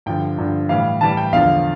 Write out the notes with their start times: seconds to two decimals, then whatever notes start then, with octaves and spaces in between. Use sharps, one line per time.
0.06 G2 D3 F3 G5
0.38 G2 D3 F3
0.69 A2 E3 G3 F5
1.01 A2 E3 G3 A5
1.17 G5
1.32 E2 D3 F3 F5